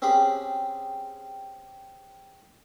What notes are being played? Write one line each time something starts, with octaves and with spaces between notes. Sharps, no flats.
C4 C#4 G4 G#4 B5